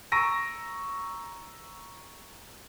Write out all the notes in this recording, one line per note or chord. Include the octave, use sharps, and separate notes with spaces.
A#5 C#6 E6 A#6 D7 D#7